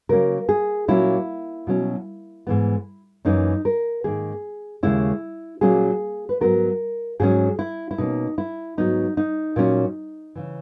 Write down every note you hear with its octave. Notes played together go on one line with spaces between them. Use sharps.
C#3 F#3 A#3 C#4 A#4
G#4
A#2 F#3 A#3 C#4 E4
B2 F#3 C#4
G#2 E3 B3
F#2 E3 A#3 C#4 D#4
A#4
G#2 D#3 A#3 G#4
D#2 C#3 G#3 C#4 E4
A#2 F#3 A#3 C#4 G#4
B4
G#2 F#3 B3 A#4
G#2 F#3 C#4 G#4
E4
E4
B2 A#3 C#4 D#4
E4
G#2 F#3 B3 D#4
D#4
A#2 F#3 C#4
C#3 E3